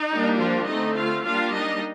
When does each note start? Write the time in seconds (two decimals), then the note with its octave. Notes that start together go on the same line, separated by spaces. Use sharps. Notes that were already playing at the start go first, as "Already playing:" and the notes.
Already playing: D#4
0.09 G3 A#3 D4
0.37 F3 F4
0.66 D3 A3 C4 D#4 D#5
0.95 F4 F5
1.23 G3 A#3 D4 F4 F5
1.52 D#4 D#5